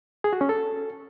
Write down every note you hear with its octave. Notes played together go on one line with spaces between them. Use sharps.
G#4
F#4
C#4
A4